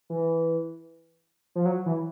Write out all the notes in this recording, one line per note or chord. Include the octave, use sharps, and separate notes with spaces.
E3
F3
F#3
E3